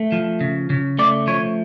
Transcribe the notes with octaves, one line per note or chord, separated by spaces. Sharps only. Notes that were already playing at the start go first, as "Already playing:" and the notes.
Already playing: A3
F3
C#3
C#3
A3 D5
F3 C#5